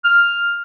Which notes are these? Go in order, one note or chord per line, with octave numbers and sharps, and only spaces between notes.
F6